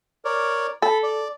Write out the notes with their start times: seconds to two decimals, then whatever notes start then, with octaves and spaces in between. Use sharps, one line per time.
0.25 A#4 C#5 D5
0.82 A4 B5
1.03 D5